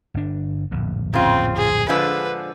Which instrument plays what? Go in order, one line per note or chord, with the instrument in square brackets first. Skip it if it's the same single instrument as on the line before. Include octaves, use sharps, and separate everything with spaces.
[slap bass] G1 D4
D1 A#1 F2
[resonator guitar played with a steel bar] C#3 F4 [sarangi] C4
[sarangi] G#4
[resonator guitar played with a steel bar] D3 F3 G#3 [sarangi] B4